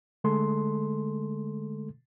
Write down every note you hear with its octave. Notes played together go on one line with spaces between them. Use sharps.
D3 G#3 A3 A4 C6